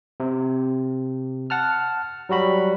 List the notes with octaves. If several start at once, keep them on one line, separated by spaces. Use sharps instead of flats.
C3
F#5 A5 F6
F#3 G3 F#4 B5